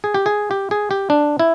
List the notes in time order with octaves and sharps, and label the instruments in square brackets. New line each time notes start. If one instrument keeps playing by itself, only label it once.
[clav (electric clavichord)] G#4
G4
G#4
G4
G#4
G4
D4
E4